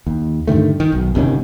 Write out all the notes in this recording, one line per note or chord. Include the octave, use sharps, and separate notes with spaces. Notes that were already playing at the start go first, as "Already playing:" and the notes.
D#2
G2 D3 D#3 A3
D#3
B1
G1 C3 D#3 C#4